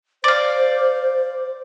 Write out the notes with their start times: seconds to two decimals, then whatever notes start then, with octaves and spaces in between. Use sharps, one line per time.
0.24 C5 D5 F5